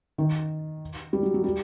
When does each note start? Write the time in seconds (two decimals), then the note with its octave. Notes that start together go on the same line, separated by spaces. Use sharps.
0.18 D#3
1.13 G3
1.23 F#3
1.34 F#3
1.44 G3